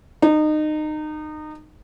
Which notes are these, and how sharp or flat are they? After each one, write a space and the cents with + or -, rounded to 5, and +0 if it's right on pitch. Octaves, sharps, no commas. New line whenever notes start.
D#4 -25